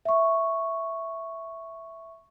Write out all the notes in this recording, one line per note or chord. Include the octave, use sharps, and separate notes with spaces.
E5 C#6